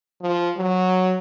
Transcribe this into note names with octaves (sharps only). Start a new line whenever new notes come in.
F3
F#3